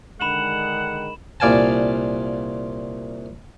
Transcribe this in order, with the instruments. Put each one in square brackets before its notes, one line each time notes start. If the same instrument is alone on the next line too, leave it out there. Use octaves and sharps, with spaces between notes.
[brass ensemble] D3 D#3 G#3 [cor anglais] F#5 [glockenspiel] B5 E7 F#7
[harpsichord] C2 A#2 D5 F5 G#5 A5